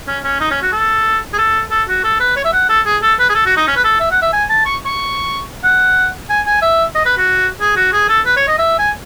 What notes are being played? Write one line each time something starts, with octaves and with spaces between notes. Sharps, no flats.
C#4
C#4
D#4
C#4
F#4
A4
G#4
A4
A4
F#4
A4
B4
C#5
E5
F#5
A4
G#4
A4
B4
G#4
A4
F#4
D#4
C#4
B4
A4
E5
F#5
E5
G#5
A5
C#6
C#6
F#5
G#5
G#5
E5
D#5
B4
F#4
G#4
F#4
G#4
A4
B4
C#5
D#5
E5
G#5